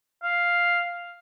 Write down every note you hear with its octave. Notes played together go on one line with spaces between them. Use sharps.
F5